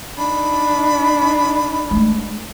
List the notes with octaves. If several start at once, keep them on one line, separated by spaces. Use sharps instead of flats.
D4 D#4 B5
G#3 A3